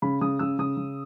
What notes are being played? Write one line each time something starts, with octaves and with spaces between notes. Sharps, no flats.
C#3 B5
C#3 D#6
C#3 E6
C#3 D#6
C#3